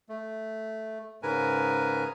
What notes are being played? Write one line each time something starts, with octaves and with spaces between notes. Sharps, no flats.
A3
G#2 C#3 A#4 B4 G#5